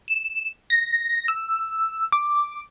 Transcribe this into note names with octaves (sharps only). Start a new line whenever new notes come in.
E7
A#6
E6
D6